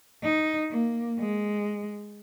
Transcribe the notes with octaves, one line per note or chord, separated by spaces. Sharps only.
D#4
A#3
G#3